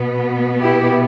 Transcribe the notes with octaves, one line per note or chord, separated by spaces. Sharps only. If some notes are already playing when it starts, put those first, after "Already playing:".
Already playing: B2 B3
E4 G4